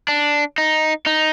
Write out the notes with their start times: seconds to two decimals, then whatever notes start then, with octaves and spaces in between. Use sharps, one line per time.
0.08 D4
0.58 D#4
1.06 D#4